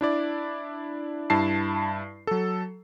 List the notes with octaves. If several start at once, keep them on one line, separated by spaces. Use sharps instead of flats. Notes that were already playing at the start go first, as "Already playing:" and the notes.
D4 E4 D5
G2 E4 A5 C7
F#3 A4